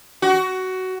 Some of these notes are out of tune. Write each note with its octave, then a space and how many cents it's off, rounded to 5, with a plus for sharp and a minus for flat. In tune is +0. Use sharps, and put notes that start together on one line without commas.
F#4 +15